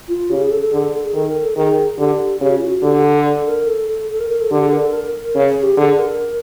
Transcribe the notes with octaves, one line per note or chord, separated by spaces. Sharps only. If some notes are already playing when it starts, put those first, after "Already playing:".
F4
C#3 G4
G#4
A4
A4
D3 G#4
A4
A4
G#4
D#3 A4
A#4
A4
D#3 G#4
G#4
D3 G4
C#3 G4
F#4
F4
F#4
D3 G4
A4
A4
A#4
A4
A4
A4
A#4
A#4
A4
D3 G4
G#4
A#4
A4
A#4
C#3
G#4
G4
D3 G#4
A#4